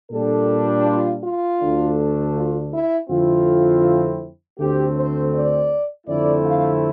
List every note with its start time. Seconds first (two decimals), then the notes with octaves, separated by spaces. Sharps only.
0.11 A#2 G3 D4 A4
0.86 F4
1.22 F4
1.60 D2 D3 A3 D4
2.34 F4
2.72 E4
3.09 F2 D3 A3 C4 E4 F4
4.59 D2 D3 A3 C4 G4
4.96 C5
5.33 D5
6.07 F2 D3 A3 C4 E4 D5
6.45 F5